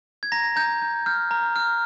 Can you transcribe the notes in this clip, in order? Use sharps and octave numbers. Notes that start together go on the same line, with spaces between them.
G#6
A#5 A#6
A#5 G6
G6
F6 G6
A#5
F6